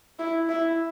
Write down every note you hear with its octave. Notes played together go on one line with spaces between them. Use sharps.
E4
E4